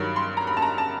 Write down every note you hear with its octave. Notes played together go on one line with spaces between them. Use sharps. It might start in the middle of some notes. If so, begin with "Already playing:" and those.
Already playing: G2 D#3 F#3
C6
A#5
B5
A5
A#5
A5